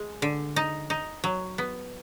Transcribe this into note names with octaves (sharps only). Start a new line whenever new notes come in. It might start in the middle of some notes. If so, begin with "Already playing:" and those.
Already playing: G#3
D3
D#4
D#4
F#3
B3